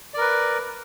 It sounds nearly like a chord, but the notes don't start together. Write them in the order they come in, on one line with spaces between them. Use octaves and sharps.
D5 A#4 B4